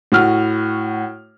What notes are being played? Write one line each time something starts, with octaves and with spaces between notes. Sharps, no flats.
A2 F#4 F6